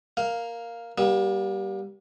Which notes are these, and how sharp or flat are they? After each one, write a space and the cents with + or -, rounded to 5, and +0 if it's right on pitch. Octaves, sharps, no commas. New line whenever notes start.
A#3 +0 F5 +0
G3 -10 A#3 +40